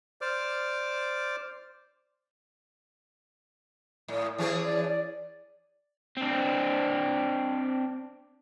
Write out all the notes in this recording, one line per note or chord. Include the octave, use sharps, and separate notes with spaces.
C5 D5 D6 F6
A2
E3 C#4 G#4
D5
D5
C4 D4